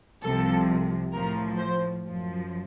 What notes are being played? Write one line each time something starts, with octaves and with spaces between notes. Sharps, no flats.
C2 C3 F3 A4
A2 F3 A#4
C5
F#2 F3